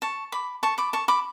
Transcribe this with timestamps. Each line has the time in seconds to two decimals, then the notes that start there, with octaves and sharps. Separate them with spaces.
0.02 A5 C#6
0.32 B5 D6
0.63 A5 C#6
0.78 B5 D6
0.93 A5 C#6
1.08 B5 D6